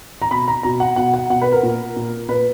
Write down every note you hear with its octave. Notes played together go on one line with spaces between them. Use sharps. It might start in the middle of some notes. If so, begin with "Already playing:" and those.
A#5
B2 B5
A#5
B2 A#5
F#5
B2 F#5
F#5
B2 F#5
B4
A#4
A#2
A#2
A#2 B4